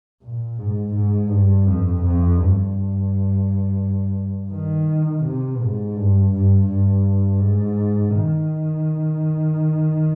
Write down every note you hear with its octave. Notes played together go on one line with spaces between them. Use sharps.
A#2
G#2
G#2
G2
F2
F2
G2
D#3
C3
G#2
G2
G2
G2
G#2
D#3